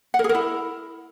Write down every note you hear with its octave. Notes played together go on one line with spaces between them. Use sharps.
F#5
A#4
G#4
A#4
E4